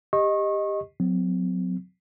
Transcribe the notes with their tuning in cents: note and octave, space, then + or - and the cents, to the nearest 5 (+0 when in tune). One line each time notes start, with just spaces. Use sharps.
G4 +20 D#5 +0 C#6 -30
F#3 -25 C4 -45